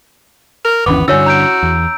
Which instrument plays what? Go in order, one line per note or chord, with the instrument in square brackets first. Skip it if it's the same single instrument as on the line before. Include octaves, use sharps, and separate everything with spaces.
[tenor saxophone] A#4 [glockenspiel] F7
[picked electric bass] G1 D#2 E3 [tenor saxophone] B3 [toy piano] C#4 B5 D6
[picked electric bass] G2 D3 [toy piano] E4 C#5 G#5 [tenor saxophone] F#4 [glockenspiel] E6
[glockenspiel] A#5 G6 D7
[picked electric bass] E2